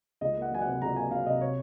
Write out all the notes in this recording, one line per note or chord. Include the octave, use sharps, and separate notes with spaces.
C#2 D#5
A#3
F#5
F#3 G#5
C3 F#5
C#2 A#5
A#3 G#5
F#3 F5
C3 D#5
C3 C#5